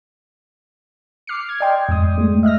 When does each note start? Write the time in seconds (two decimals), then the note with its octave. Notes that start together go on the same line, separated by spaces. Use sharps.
1.27 D6 F6 C7 C#7
1.49 G#6
1.60 D5 D#5 G5 C6
1.89 F2 G#2 D#6
2.18 G#3 A3
2.43 D#5 E5 F6 A#6